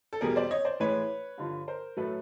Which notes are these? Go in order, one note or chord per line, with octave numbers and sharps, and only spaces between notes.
A4
E2 B2 G3 G#4 A#4
C5 D5
C#5 D#5
C5 D5
A2 E3 G#3 B4 C#5
G2 D3 F3
A#4 C5
A2 F#3 A3 A4 B4